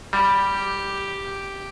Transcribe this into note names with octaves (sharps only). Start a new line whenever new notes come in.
G3 G4